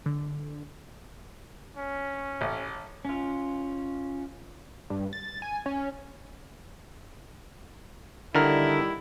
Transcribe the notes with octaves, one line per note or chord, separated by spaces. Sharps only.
D3
C#4
A1
C#4 F4
G2
A6
G#5
C#4
D3 D#3 G3 E4 A#4